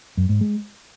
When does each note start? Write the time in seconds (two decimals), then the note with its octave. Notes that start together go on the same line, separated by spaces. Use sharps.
0.17 F#2
0.29 G#2
0.41 G#3